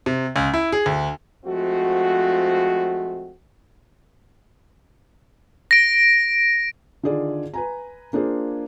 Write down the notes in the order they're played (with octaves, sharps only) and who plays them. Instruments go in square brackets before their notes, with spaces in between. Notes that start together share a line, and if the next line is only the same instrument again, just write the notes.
[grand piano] C3
C#2
E4
G#4
D2
[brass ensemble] F3 G#3 A3 C4 F#4
[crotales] A#6 D7
[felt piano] D3 D#3 F4 G#4 D5
B4 G#5 A#5
A#3 D4 F4 G#4 C5